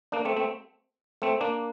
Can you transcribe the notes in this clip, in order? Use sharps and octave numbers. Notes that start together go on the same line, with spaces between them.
A#3 D4
A3 C4
A3 C4
A3 C4
A#3 D4